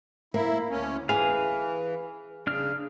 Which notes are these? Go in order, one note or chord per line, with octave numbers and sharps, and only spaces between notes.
A#3 E4
D2 C#4
E3 G#4 B4 F5
C#3 D4 F6